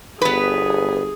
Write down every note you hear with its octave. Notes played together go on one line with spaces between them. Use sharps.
G1 B3 G#4 B4